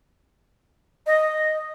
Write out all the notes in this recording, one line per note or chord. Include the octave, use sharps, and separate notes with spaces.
D#5